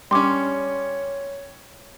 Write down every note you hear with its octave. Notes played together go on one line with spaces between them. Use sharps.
G3 C#4 C#5 C6 D6